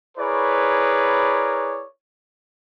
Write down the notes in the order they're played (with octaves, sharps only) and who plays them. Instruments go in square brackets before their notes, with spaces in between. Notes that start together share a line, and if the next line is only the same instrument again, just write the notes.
[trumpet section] E4 G#4 A#4 B4 C#5 D5